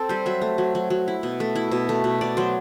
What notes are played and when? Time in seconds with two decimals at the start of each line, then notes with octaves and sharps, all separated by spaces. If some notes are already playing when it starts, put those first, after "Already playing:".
Already playing: C4 A4
0.09 G3 C5
0.26 F#3 E5
0.42 A3
0.58 F#3
0.75 F#3
0.90 F#3
1.08 E4
1.23 B2
1.40 A3
1.55 E4
1.71 B2
1.89 A3
2.04 B2
2.21 B2 D5
2.37 F#3 C5